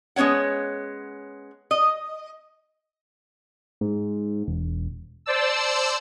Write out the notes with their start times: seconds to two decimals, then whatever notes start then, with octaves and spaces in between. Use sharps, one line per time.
0.16 G#3 B3 C#4 C#5 F#5
1.71 D#5
3.81 G#2
4.48 E1
5.26 C5 D5 A5 E6